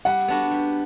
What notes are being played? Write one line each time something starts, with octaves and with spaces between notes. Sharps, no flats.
G3 F#5
B3 D4 F#4
G3